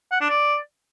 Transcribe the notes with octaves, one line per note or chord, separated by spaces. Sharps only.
F#5
D4
D5